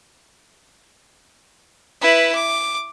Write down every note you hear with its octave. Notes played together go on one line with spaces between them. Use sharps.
E4 B4
D6